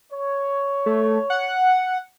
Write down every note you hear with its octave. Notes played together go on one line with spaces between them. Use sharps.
C#5
A3
F#5